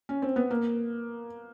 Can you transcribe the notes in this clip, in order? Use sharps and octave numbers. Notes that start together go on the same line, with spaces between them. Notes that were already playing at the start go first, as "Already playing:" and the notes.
C#4
C4
B3
A#3